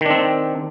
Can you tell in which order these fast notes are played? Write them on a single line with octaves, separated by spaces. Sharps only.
D#3 D4 C4